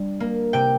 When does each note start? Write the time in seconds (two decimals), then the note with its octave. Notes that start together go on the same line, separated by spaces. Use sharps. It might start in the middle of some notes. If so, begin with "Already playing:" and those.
Already playing: G3 D4
0.20 A#3
0.53 C3 G5